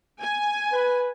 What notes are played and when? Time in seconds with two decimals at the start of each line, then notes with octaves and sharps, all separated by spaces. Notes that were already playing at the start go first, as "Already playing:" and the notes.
0.22 G#5
0.72 B4